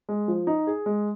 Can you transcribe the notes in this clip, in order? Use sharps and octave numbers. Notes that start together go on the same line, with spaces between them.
G#3
F3
D#4
G#4
G#3